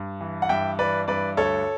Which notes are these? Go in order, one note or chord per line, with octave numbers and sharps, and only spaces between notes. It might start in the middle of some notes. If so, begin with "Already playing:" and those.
Already playing: G2
E3
F#5
G2 E5 G5
E3 B4 D5
G2 B4 D5
D2 A4 C#5